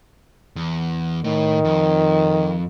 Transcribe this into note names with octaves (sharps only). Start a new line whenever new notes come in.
E2
A2 D#3
F2